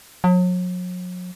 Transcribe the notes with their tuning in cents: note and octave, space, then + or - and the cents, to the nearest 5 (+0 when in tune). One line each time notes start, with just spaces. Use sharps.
F#3 -40